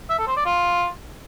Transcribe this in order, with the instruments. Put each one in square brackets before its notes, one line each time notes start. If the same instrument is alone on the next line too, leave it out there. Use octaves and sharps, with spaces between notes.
[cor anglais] E5
A4
C5
D5
F4